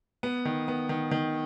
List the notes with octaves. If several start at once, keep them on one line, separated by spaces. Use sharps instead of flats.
B3
D#3
B3
D#3
D#3